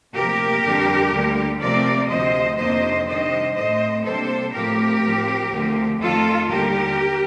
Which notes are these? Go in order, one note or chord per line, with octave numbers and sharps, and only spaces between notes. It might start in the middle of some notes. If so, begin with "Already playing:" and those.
D2 C3 F3 A#3 G4 A#4
F2 D3 G3 D4
D2 D3 G3 A#3
C3 F3 A3 C4 A#4 D5
D2 C3 F3 C5 D#5
F2 C3 D#3 A#3 D4 C5 D#5
C3 D#3 G3 D4 C5 D#5
A2 A3 C4 C5 D#5
C3 G3 A#3 D4 A4 C5
A2 F3 A3 C4 G4 A#4
A2 F3 C4
D2 D3 F3 A3 C4
F2 D#3 A3 F4 A4
D#2 D3 G3 G4 A#4